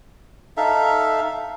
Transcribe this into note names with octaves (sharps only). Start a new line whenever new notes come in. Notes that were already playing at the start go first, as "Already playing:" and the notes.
D#4 A4 E5 F5